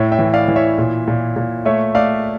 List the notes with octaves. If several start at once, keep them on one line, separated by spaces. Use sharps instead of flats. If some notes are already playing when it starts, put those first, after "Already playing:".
Already playing: A2 C#5 E5
E5 G5
E3
D5 F5
E3
C#5 E5
A#2
A#2
A#2
A3 C#5 E5
A3 D5 F5